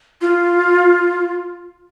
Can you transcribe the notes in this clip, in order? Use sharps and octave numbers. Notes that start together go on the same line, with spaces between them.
F4